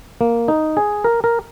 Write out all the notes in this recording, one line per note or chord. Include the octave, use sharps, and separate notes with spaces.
A#3
D#4
G#4
A#4
A#4